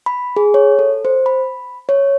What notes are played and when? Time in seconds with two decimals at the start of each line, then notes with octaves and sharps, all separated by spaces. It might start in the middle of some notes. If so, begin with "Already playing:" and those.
0.06 B5
0.36 G#4
0.54 C#5
0.79 A4
1.05 C5
1.26 B5
1.89 C#5